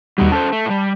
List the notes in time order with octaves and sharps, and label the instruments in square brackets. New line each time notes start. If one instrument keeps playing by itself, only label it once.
[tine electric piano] D#2 G3 [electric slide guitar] B2 D#4 F#4
[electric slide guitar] C#4 A4 C5 [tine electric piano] A5
[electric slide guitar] A3
A2 G3